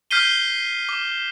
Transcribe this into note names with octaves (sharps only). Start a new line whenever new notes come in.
F6 G6 B6 C7 D#7 G7
D6